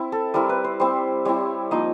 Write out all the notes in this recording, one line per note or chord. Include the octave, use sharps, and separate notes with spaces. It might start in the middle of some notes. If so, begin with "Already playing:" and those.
Already playing: C4 E4
A4
G3 C4 E4 A#4
B4
C5
G3 C4 E4 C5
G3 C4 E4 C#5
F3 A#3 D#4 D#5